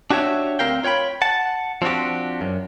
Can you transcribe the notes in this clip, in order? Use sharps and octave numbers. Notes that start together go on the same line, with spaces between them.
D4 F#4 G4 C#5 E5
D2 C4 A#4 F5 G5
F4 C#5 F#5 G5 B5
F#5 A5
F3 C4 D4 F#4 G4
F#2